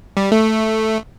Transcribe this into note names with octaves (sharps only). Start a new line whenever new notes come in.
G3
A3